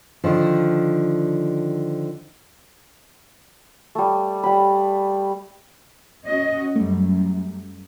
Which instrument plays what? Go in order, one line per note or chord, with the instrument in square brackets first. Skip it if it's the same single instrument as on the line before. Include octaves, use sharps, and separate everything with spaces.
[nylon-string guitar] D3 D#3 F3
[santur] G3 A3
G3 B5
[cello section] C#4 F#4 D#5
[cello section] F#2 [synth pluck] G3 A3